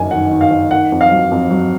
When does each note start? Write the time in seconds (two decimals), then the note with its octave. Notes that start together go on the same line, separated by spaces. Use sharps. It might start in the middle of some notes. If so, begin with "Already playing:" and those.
Already playing: F#1 F#2 D#3 G#5
0.11 D#3 F#5
0.31 D#3
0.41 F5
0.51 F#1
0.71 D#3 F#5
0.92 F2
1.01 F5
1.11 F#3
1.31 F2
1.51 F#3